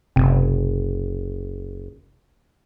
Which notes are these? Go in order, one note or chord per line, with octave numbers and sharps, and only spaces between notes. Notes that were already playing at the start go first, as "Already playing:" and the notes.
F#1 C3